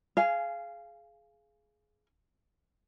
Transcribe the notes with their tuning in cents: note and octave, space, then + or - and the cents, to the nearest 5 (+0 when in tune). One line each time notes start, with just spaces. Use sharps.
G#4 +20 F5 -15 G#5 +0